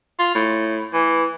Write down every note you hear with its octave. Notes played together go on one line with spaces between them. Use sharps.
F4
A2
E3